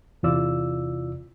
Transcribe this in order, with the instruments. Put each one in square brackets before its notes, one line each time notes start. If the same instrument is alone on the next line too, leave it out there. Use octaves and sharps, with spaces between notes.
[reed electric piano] E2 C3 E4 F4 D5 E6